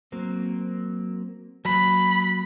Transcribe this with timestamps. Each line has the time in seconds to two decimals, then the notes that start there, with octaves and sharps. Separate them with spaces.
0.12 F#3 A#3 C4
1.65 F#3 A#3 B5